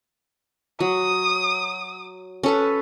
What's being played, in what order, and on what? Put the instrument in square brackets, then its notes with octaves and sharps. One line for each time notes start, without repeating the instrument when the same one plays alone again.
[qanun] F#3 [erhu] D#6
[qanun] C#4 A4 B4